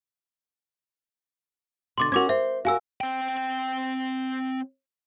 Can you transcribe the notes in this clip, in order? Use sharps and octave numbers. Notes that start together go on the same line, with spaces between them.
B2 D3 C6 D6 A6
C#4 F#4 A#4 D6 G#6
C5 E5
F#4 G#4 A#4 F5 G#5 E6
C4 G5